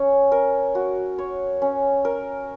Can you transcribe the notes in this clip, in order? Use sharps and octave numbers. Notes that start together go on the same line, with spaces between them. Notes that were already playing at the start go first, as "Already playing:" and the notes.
Already playing: C#4 C#5
A#4
F#4
C#5
C#4
A#4